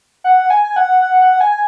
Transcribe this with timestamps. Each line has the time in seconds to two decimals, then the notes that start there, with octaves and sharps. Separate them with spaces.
0.24 F#5
0.50 G#5
0.64 G#5
0.76 F#5
1.01 F#5
1.21 F#5
1.41 G#5
1.52 G#5